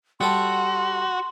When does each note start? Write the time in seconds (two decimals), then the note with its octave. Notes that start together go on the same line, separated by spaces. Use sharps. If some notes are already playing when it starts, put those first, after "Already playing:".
0.21 G3 F#4 A4 C6